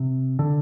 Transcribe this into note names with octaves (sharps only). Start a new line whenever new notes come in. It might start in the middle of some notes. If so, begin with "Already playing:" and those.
Already playing: C3
D3